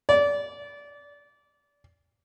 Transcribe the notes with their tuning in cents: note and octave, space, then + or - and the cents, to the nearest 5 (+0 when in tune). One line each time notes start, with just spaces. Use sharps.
D5 -25